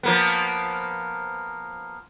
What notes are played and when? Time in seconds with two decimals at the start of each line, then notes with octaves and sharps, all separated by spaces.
0.03 F3 A#3 B3